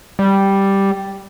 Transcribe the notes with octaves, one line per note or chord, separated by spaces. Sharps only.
G3